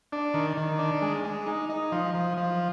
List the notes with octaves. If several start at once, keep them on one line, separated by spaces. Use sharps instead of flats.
D4
D#3
D#3
D4
G#3
G#3
D#4
D#4
F3
F3
F3